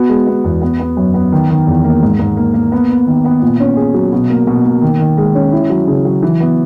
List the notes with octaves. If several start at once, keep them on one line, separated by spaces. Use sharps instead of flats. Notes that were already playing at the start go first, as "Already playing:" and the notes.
Already playing: B3 F#4
G#3
B3
E2
B3
B3
F#2
B3
D#3
D#3
E2
A#3
G#2
G#2
A#3
A#3
B3
B3
D#3
B3
A#2
C#4
G#4
F#3
B2
A#3
B2
A#3
D#3
D#3
G#3
C#4
E4
F#3
C#3
F#3
E3
B3